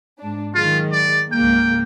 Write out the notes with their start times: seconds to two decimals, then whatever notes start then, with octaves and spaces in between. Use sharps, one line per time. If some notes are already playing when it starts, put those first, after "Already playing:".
0.20 G#2 D4
0.54 D#3 F#3 G#3 F4
0.92 D5
1.32 C#2 G#2 A#3 G5